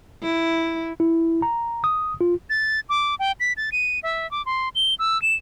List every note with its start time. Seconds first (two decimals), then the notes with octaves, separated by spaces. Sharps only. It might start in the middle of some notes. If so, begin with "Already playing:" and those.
0.22 E4
1.00 E4
1.42 A#5
1.84 D#6
2.21 F4
2.50 A6
2.89 D6
3.19 G5
3.40 B6
3.57 A6
3.72 D#7
4.03 E5
4.31 D6
4.46 C6
4.75 G7
4.99 E6
5.22 E7